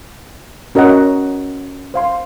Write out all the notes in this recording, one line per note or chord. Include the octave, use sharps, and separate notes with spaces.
C#4 F#4 A#4 D#5 F#5
C5 F5 C6